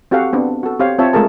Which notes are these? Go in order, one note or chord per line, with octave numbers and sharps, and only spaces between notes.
C4 F#4 G4 A4 F5 F#5
B3 C4 D4
F#4 A4
C4 G4 C5 C#5 F5
C4 F4 C5 C#5 E5 A5
G#3 A3 F4 G#4 A#4 A5